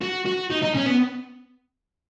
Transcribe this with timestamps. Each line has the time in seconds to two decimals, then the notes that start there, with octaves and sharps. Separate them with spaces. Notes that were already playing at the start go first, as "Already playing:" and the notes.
0.02 F#4
0.26 F#4
0.51 D#4
0.62 D#4
0.74 C#4
0.86 B3